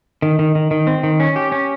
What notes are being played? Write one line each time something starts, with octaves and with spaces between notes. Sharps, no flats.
D#3
D#3
D#3
D#3
C4
D#3
C#4
G4
C#4